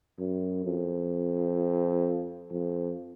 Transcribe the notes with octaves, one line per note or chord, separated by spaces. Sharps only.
F#2
F2
F2